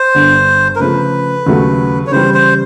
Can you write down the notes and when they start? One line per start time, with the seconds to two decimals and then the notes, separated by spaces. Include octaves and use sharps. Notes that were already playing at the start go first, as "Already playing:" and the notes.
Already playing: C5
0.15 G1 G2 D3
0.76 A#4
0.80 C#3 F3 A3 B4
1.46 D#2 C#3 F#3 A3
2.07 C#5
2.12 C#3 E3 G3 C5
2.34 C5